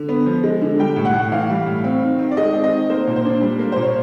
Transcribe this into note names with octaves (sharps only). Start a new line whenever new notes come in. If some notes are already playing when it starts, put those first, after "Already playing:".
Already playing: D3
B3
F3
G#3
D3
G3 G5
A2
F#5
A2
E3 F5
G3
A2
C4
D#3
D#3
D5
G#3 D#5
C4
D#5
D#3
A#3 C5
A#2
C5
D4
G3
A#3
A#2 C5
C#5